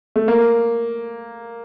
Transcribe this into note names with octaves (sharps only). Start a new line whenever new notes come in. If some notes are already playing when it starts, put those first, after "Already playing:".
A3
A#3